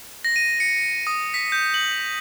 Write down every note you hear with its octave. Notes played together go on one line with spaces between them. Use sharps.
A#6
D#7
C#7
D#6
B6
G6
F#7